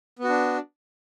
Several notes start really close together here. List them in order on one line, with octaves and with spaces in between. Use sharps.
B3 F#4 D4